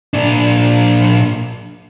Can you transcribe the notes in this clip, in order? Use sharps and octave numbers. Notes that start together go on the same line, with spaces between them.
A#2 D4